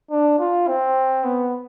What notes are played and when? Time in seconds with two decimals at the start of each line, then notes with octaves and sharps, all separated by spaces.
0.11 D4
0.40 F4
0.68 C4
1.25 B3